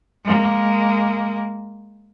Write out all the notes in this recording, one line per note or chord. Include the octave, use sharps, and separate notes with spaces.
G#3 A#3